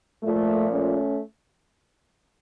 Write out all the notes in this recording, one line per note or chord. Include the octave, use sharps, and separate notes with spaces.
A#2 F3 A3
A3 C#4